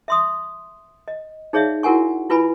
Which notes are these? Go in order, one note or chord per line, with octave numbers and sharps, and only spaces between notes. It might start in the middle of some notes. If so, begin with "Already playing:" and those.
E5 C6 D#6
D#5
D#4 G#4 C#5 D5 E5 F5
E4 F#4 A#4 F#5 G#5 C#6
E4 F4 B4 G#5 B5